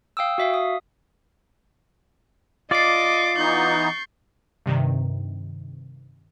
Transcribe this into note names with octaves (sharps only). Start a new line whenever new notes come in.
F5 G5 D#6 E6
F#4 E5 F5
D#6
F4 D5 D#5 D6 A6 C7
E3 B3 D#4 C#6 G6
G2 C3 D#3